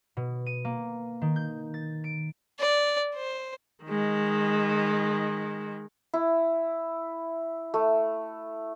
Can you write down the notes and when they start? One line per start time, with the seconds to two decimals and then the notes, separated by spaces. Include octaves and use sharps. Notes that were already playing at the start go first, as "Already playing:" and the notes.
0.17 B2
0.46 D#7
0.65 A#3
1.22 D#3
1.36 G6
1.74 A6
2.04 D7
2.60 D5
3.15 C5
3.85 D#3 G#3
6.14 E4
7.74 A3